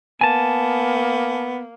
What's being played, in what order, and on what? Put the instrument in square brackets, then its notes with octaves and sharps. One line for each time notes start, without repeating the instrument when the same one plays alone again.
[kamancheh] A#3 [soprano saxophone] B3 [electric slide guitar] G#5 A5